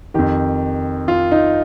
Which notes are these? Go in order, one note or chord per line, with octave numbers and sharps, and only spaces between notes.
F2 D#3 G4
F4
D#4